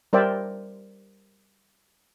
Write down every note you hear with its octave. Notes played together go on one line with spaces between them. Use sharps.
G3 A#4 C5 D5 E5 G5